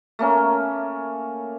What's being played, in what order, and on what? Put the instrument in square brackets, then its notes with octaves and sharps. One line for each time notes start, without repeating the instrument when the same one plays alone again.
[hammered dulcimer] A3 A#3 C#4 A#4